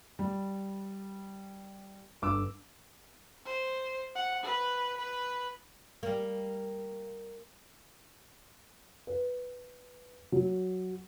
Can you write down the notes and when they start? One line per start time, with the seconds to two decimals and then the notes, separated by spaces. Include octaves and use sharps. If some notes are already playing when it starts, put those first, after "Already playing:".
0.19 G3
2.22 G1 D6 E6
3.45 C5
4.15 F#5
4.44 B4
4.98 B4
6.03 G3 A#3
9.07 B4
10.32 F#3